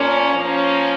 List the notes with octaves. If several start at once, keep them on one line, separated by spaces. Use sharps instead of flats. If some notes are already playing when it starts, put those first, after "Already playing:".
Already playing: A#2 F3 A#3 C#4
F3 A#3 C#4